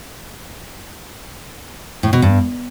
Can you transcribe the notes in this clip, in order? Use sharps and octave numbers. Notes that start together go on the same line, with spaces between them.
A2
B2
G2